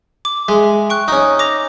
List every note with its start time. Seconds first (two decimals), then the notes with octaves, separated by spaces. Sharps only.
0.25 D6
0.48 G#3 E5
0.90 G5 C#6 F#6
1.08 C#4 D#4
1.39 D6 A#6 F7